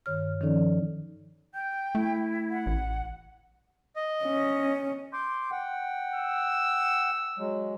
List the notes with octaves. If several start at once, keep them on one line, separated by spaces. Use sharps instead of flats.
G2 D#3 C#5 F6
D#3 F3 C#4 D#4 A4 D5
G5 G6
A3 E4
F#5
A1
D#5
C#4
C6 D6 G6
F#5 G5
E6
F#3 G#3